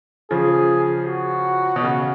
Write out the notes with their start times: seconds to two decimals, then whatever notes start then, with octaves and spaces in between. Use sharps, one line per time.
0.31 C#3 F3 G#4
1.07 F#4
1.76 B2
1.83 C#3